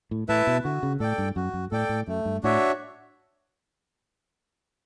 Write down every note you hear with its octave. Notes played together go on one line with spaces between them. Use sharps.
A2
A2 E4 B4 E5 A5
B2
D3 F#4
C#3
A2 A4 D5 G5
G2
F#2 F#4
F#2
A2 A4 D5 G5
A2
F#2 A3
G2
A2 D4 F#4 C#5 E5